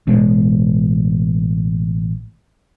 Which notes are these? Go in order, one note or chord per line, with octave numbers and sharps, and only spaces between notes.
A1 B2 G#3